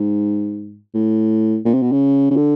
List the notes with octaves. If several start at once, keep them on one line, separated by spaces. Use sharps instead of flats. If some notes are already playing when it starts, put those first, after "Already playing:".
Already playing: G#2
A2
A#2
C3
B2
C#3
C#3
D3